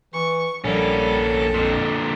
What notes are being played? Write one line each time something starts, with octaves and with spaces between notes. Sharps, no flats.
E3 C#6
A#1 G3 A#3 C#4 A4
F2 A#2 D3